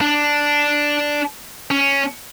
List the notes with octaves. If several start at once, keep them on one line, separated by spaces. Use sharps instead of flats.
D4
C#4